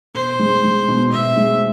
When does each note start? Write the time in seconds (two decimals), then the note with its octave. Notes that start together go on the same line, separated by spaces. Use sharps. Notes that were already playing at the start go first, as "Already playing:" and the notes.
0.14 B2 C5
0.39 G#3
0.64 G#3
0.88 B2
1.12 B2 E5
1.37 G#3